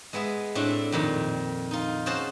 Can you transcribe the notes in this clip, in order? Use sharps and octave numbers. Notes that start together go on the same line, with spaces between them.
G#3 B3 G#4 E5
A2 A3 C4 D4
F2 A#2 D#3
D#4 F4
C#4 F#4 G#4 C5 A5